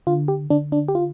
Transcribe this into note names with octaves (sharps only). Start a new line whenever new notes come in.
D3 F4
G4
D3 D4
D4
G4
F4